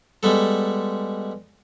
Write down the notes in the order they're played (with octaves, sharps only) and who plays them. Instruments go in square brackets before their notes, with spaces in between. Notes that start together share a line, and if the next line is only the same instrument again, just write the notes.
[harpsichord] G3 G#3 B3 A4